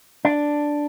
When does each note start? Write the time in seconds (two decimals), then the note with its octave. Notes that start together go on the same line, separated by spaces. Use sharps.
0.25 D4